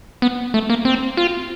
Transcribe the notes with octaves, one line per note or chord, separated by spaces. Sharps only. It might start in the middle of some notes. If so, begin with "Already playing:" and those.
B3
A3
A#3
C4
F4